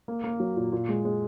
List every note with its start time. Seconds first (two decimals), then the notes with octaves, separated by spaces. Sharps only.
0.08 A#3
0.24 A#3
0.40 F#3
0.56 A#2
0.72 A#2
0.89 G#3
1.05 G#3